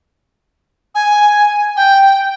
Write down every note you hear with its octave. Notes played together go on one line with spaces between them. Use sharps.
G#5
G5